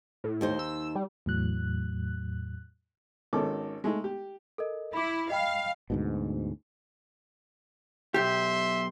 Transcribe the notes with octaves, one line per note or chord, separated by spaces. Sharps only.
A2
D#2 D#4 C5
E6
G3
E2 A2 F#3 F#6
G#1 D#3 C#4 A4 D6
G#3 A3 D#4
G4
A4 A#4 D#5
E4 B5 D6
D#5 F5 G5 B5
D2 G#2 B2
B1 G#2 G4 E5 C6